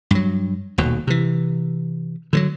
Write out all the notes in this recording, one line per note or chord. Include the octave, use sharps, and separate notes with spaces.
G2 F#3
D#1 D#2 B2
C3 E3
D3 F3 F#3